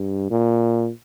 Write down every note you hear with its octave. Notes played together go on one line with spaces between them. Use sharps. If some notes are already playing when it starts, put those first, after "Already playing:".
Already playing: G2
A#2